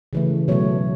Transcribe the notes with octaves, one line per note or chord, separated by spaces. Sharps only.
C#3 E3 A3
B2 F#3 A3 C#5